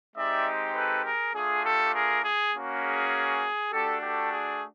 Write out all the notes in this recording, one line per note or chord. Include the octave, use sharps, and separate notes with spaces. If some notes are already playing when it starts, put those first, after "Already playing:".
G#3 C4 D#4 G4 D5 E5
A4 B4
G#4 A#4
A3 D4 F4 G#4
G4 A4
G#4 A#4
G#4
A#3 C#4 F#4
G#4
A3 D4 F#4 G4 A4
G4 A4
G#4